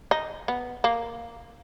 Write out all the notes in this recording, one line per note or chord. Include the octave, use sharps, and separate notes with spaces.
D#4
B3
A#3